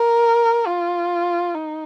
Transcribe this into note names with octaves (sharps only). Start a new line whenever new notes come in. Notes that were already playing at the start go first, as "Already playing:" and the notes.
Already playing: A#4
F4
D#4